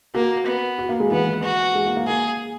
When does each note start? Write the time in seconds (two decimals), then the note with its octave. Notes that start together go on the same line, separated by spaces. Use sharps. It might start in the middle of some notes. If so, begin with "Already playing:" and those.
0.14 A#3 F#4
0.46 B3
0.79 F#4
0.89 A#3
1.00 G#3
1.11 E3 B3
1.43 F#4
1.75 G#3
1.86 A#3
1.96 A#3
2.07 A#3 G#4